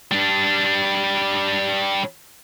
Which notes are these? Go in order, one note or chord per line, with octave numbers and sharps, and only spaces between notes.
G3 D4